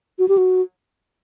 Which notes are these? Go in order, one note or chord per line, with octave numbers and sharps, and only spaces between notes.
F#4
G4
F#4